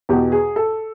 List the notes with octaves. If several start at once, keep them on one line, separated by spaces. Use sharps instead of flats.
E2 B2 G4
G#4
A4